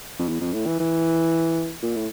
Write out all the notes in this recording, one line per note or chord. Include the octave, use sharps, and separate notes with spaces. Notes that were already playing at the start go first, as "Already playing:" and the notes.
F2
E2
F2
A2
E3
E3
A#2
A2